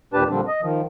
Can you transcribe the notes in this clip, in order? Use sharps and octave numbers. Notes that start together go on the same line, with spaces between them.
D#2 A#2 D4 G4 B4 A5
A#2 D3 F3 G3 C4 D4
D#5
D#3 F3